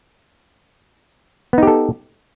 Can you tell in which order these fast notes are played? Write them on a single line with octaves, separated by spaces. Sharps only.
B3 D#4 G4 A4